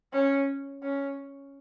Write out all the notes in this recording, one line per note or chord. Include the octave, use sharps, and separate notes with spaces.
C#4
C#4